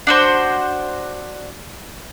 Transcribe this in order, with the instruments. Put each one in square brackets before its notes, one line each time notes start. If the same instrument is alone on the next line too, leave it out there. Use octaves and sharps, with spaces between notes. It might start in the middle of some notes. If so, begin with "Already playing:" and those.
[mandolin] D4 F#4 C5